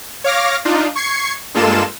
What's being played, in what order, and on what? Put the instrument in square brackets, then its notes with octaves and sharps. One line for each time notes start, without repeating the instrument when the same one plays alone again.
[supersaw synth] C#5 F5 D6 F6 A#6
D4 D#4 F4
C#6 G#6 C7 C#7
G2 G#3 A#3 F4 A4 E7